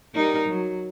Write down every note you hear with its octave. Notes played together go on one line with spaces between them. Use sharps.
G3 D#4 A#4
F#3